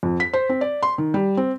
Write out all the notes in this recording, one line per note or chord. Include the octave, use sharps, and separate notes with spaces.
F2
B6
C5
C4
D5
C6
D#3
G3
C4